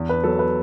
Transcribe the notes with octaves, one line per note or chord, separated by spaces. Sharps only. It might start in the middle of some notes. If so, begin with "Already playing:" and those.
Already playing: E2
B4
F#3 A4
B4